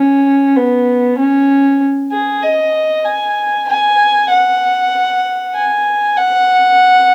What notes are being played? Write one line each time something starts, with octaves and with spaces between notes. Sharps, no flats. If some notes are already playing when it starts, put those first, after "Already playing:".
Already playing: C#4
B3
C#4
G#4
D#5
G#5
G#5
F#5
G#5
F#5